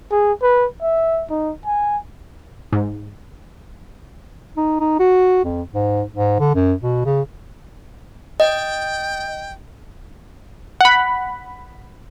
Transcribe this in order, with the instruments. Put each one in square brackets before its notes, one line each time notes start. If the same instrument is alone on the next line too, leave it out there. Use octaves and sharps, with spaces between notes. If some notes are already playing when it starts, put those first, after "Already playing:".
[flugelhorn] G#4
B4
E5
D#4
G#5
[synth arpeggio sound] G#2
[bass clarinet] D#4
D#4
F#4
F2
G#2
G#2
D3
F#2
B2
C#3
[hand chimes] D#5 [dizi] G5
[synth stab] F#5 B5